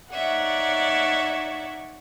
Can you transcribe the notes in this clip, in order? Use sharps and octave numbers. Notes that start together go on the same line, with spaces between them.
D#4 C#5 D5 E5 F#5